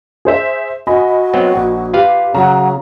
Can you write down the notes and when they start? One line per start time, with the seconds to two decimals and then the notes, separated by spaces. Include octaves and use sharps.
0.25 G#4 C5 E5
0.87 F#4 D#5 G#5 B5
1.34 F#3 B3 C4
1.56 A#1
1.94 F4 G4 B4 F5
2.35 C#3 F#3 A#5